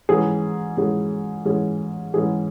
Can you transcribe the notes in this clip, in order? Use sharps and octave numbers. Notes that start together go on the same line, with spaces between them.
G#2 E3 C#4 G#4
G#2 E3 C#4 G#4
G#2 E3 C#4 G#4
G#2 E3 C#4 G#4